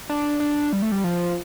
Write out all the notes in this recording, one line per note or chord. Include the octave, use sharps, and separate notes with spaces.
D4
D4
G3
A3
G3
F3